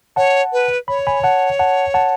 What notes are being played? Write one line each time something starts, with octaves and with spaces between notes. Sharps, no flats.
C#5 F#5 A5
B4
C#5 B5
G#5 B5
F#5 A5
F#5 A5
F#5 A5